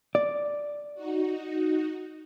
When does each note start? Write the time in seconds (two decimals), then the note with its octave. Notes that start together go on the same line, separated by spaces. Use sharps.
0.15 D5
0.94 D#4 F#4